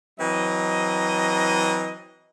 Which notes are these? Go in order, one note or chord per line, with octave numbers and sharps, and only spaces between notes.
E3 F#3 C4 D#5